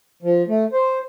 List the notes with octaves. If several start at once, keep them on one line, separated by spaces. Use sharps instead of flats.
F3
A3
C5